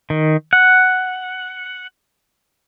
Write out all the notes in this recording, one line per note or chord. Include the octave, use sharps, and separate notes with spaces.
D#3
F#5